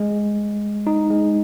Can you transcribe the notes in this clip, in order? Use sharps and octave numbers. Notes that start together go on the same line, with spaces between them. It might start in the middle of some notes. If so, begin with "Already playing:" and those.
Already playing: G#3
D#4
G#3